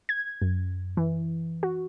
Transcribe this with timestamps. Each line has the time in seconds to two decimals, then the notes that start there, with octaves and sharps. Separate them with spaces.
0.09 G#6
0.42 F#2
0.97 E3
1.63 F#4